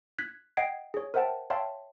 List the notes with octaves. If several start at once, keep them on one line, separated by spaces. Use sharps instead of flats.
F#6 G#6 B6
D#5 F#5 G5 G#6 C7 D7
G#4 C#5
A#4 C5 E5 F#5 G5 A5
C#5 E5 F5 G5 A5 C6